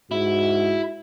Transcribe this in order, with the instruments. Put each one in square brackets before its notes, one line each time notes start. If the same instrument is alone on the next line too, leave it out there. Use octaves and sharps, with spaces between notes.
[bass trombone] G#2 [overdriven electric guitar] E4 [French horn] F#4